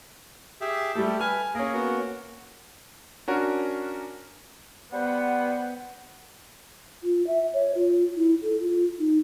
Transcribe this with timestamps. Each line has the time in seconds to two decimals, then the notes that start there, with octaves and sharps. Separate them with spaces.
0.61 G4 G#4 E5
0.95 G3 A3 G4 A4
1.19 B4 G#5 F6
1.55 A#3 C#4 G#4 A#4
1.73 B3 F#4
3.28 C#4 D4 F#4 A#4
4.93 G3 B3 C5 F#5
7.03 F4
7.27 E5
7.53 C#5
7.75 F4
8.16 E4
8.42 A4
8.60 F4
8.99 D#4